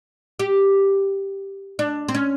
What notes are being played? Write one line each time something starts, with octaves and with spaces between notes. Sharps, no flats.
G4
D4
C4
C#4